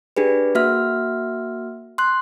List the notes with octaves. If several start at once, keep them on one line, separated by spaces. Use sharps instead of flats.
D4 G4 G#4 B4
A#3 F#4 E5 F6
C6 F#6